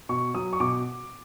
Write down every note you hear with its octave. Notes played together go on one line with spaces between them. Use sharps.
B2 C#6
F#3 D#6
C#6
B2 D6